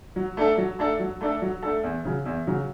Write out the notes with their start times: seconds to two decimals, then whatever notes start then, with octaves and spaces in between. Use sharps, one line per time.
0.16 F#3
0.37 A3 D4 A4
0.58 F#3
0.79 A3 D4 A4
0.99 F#3
1.21 A3 D4 A4
1.42 F#3
1.63 A3 D4 A4
1.83 E2
2.05 C#3 F#3
2.26 E2
2.47 C#3 F#3